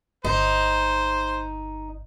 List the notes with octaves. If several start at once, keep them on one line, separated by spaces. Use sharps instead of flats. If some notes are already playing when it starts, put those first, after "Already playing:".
G1 D#4 C5